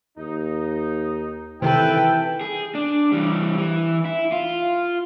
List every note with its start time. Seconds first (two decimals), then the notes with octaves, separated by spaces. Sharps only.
0.18 D#2 D#4
1.62 C3 D#3 E3 A4 B4 G5
2.41 G#4
2.75 D4
3.12 E3 G3
3.58 E3
4.05 E4
4.32 F4